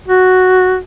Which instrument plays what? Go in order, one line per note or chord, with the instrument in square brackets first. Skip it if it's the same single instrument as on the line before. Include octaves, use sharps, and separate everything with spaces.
[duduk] F#4